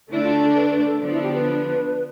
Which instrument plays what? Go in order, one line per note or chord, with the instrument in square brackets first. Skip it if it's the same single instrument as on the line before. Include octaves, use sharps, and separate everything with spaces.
[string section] D3 A3 D4 [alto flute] E4
[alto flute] F4
A4
B4
B4
A4
[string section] D3 F3 B3 D4
[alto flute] E4
G4
B4